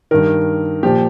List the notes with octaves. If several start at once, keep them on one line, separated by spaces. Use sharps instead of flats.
G2 D#3 A#4
A#2 F3 G4